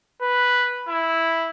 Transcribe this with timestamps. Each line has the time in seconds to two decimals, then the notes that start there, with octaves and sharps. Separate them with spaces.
0.22 B4
0.88 E4